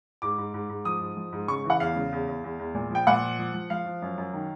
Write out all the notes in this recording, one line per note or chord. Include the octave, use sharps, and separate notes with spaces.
G#2 D6
G#2
G#2
G#2
F3 D#6
G#2
F3
G#2
C#3 C#6
E3
F#5
E2 F5
C#3
E2
E2
E2
E2
A#2
F3 G5
A#2 F#5
F3
F3
F3
F3 F5
F3
F#2
F#2
D#3